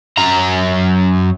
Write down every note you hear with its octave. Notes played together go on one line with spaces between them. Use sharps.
F#2 A#5